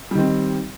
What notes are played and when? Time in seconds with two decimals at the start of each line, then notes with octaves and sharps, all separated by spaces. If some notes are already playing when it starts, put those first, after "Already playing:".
0.11 G3
0.15 D#3
0.19 C4